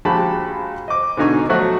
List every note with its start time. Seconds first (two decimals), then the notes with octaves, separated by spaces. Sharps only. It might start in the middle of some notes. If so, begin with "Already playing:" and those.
0.05 A#1 G#3 F#4 G4 A5 B5
0.88 D#5 D6
1.17 G#2 B2 D3 D#4 G#5 C#6
1.49 F3 F#3 A3 F#4